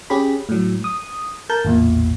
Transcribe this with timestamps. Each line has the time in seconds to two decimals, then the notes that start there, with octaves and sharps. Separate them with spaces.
0.10 C#4 G4 G#4 B5
0.49 A2 F#3
0.84 D#6
1.50 A#4 A5 G6
1.65 A1 E2 A#2